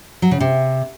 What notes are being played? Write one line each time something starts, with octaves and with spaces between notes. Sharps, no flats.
F#3
C#3
C3